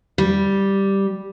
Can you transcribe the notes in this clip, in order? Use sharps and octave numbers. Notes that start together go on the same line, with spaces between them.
G3